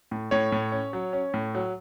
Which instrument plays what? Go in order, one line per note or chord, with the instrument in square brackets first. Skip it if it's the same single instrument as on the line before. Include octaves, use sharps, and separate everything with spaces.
[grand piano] A2
A2 C#5
A2
C#4
F#3
C#4
A2
F#3